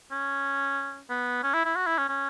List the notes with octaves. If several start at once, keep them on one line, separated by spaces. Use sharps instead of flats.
C#4
B3
C#4
E4
E4
F#4
E4
C#4
C#4